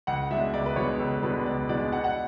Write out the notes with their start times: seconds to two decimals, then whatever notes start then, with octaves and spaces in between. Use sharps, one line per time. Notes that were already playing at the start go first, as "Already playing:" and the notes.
0.07 C#2 F#5
0.31 B2 G#3 D4 E5
0.54 C#2 D5
0.66 B4
0.76 B2 G#3 D4 C#5
0.99 C#2 A4
1.23 B2 G#3 D4 B4
1.46 C#2 D5
1.69 B2 G#3 D4 D5
1.92 B2 F#5
2.04 F#5